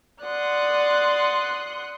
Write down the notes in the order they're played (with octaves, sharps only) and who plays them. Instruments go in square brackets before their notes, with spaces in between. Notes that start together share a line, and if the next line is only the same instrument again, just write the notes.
[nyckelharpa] D5 F#5 [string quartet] C6 D#6 F#6